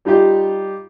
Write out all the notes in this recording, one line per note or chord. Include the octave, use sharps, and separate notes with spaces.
G3 D#4 F4 G4